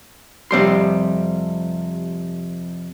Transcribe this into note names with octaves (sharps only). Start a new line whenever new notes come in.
F2 C3 G3 C6